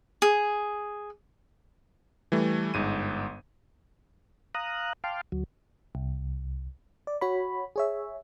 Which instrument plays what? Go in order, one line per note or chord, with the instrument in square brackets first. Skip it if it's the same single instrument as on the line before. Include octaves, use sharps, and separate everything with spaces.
[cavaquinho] G#4
[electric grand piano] E3 G3 A3
G1 G#2 D#7
[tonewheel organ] F5 A#5 D#6 F#6
F5 G5 A5 C6 D6 F6
D2 F#3
[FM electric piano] C2
D5
F#4 C#5 B5
G#4 C#5 E5